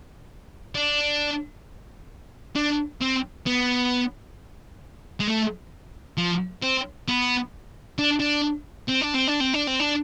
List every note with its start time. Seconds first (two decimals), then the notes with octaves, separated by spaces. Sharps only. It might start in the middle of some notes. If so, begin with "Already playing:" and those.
0.75 D4
2.56 D4
3.01 C4
3.46 B3
5.20 G#3
5.28 A3
6.18 F3
6.62 C4
7.08 B3
7.99 D4
8.20 D4
8.89 C4
9.02 D4
9.15 C4
9.28 D4
9.41 C4
9.54 D4
9.67 C4
9.80 D4